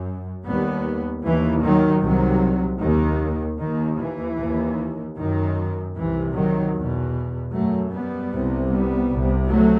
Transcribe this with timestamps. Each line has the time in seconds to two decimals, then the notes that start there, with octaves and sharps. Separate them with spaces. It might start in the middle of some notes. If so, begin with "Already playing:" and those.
Already playing: F#2
0.45 D#2 G3 B3
1.25 D#2 E3
1.63 D#3 F#3
2.02 C2 C3 D#3 F#3
2.81 D#2 D#3
3.59 D#2 D#3
3.99 E3
4.38 D#2
5.17 F#2 D#3
5.96 C2 C3 E3
6.35 D#3 F#3
6.74 E2 B2
7.52 F#2 F#3 A3
7.92 G3 B3
8.31 C2 C3
8.70 G3 B3
9.10 C2 C3
9.49 F#3 A3